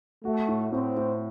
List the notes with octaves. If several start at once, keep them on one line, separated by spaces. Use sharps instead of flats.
A3 F#4
A2
A2 C4
A2